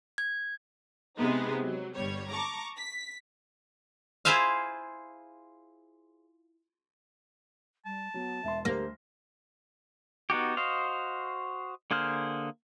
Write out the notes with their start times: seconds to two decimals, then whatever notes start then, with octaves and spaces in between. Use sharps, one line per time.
0.18 G#6
1.17 C3 G#3 B3 D#4
1.63 F#3
1.94 G1 G3 C#5
2.31 A5 A#5 C#6 D6
2.77 B6
4.25 E4 F4 G#4 C5 E5 F5
7.86 G3 A5
8.14 F#3 B3
8.44 E1 E5 C6
8.65 D2 A#3 G4 C5
10.30 B3 D#4 F#4 G4
10.57 F#4 C5 D#5 F5
11.91 D3 A#3 G#4 C5 F6